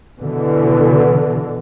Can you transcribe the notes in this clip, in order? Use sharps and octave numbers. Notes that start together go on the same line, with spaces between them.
B2 D3 E3